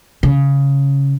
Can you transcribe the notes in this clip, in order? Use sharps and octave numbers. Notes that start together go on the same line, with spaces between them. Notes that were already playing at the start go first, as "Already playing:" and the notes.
C#3